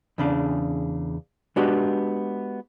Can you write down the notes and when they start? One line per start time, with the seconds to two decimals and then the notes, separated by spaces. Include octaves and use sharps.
0.18 E2 C#3 D4
1.56 G#3 B3 D4 F#4 G4